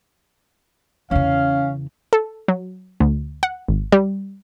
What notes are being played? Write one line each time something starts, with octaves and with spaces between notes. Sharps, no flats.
E2 C#3 C#4 F5
A4
F#3
D2
F#5
G#1
G3